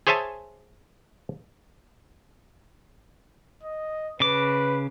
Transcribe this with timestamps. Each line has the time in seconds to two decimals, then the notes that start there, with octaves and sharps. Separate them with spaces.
0.07 G#4 C5 C#5 E5 G#5 A5
3.63 D#5
4.20 C#3 B4 D6